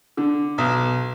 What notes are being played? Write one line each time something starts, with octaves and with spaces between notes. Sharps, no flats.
D3
B1